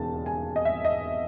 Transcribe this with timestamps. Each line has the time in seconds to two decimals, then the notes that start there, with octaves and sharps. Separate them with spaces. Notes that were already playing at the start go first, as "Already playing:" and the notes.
Already playing: E1 D#2 C#3 A5
0.26 G#5
0.56 D#5
0.65 E5
0.85 D#5